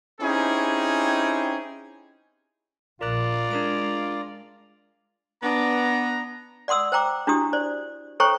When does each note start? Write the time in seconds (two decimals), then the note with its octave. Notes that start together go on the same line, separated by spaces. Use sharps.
0.21 C4 C#4 D#4 E4 G4 G#4
3.01 A#1 F4 A#4 D5 A#5 F#6
3.51 G#3 D4 A#4 D7
5.43 B3 D4 A#5
6.68 D5 F#5 C6 D#6 E6
6.92 C5 G5 A#5 D6
7.27 D4 E4 F#4 G4 D#6
7.53 C5 D5
8.20 A4 C5 C#5 G5 A#5 C#6